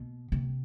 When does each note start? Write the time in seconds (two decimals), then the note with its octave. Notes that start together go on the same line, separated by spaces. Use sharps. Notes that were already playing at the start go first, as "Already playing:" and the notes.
Already playing: B2
0.32 C3